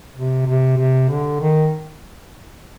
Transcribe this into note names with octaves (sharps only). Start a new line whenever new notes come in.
C3
C3
C3
D3
D#3